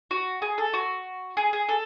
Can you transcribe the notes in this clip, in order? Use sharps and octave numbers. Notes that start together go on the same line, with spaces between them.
F#4
G#4
A4
F#4
G#4
G#4
A4